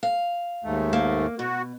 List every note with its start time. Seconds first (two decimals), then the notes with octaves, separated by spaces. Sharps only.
0.03 F5
0.64 D#2 G#2 A3
0.93 A#3
1.39 B2 F#4